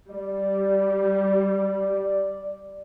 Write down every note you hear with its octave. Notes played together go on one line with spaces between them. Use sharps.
G3 D5